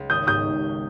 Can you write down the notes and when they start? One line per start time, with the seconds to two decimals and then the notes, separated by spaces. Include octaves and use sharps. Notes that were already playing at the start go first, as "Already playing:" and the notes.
Already playing: C#2
0.10 G#1 D#6 G6
0.27 G#2 D#6 G6